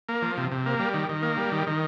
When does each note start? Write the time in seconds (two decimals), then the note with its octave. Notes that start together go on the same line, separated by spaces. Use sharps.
0.09 A#3
0.22 F3
0.37 C3
0.52 C3
0.66 A#3
0.80 G3
0.94 D#3
1.09 D#3
1.23 A#3
1.37 G3
1.52 D#3
1.67 D#3